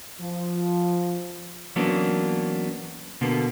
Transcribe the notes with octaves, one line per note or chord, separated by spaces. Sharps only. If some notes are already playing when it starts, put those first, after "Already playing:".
F3
E3 F#3 A#3 B3 C#4 D4
B2 D3 A#3 B3